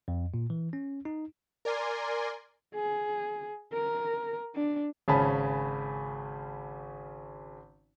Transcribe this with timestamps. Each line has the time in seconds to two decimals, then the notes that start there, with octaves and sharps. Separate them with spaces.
0.08 F2
0.34 A#2
0.50 E3
0.73 C#4
1.05 D#4
1.65 A#4 D5 G#5 C6
2.74 G#4
3.72 A#4
4.55 D4
5.08 G#1 C#3 C#4 G#5 A5 B5